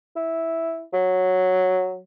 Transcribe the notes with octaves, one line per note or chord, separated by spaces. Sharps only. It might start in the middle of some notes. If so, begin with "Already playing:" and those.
E4
F#3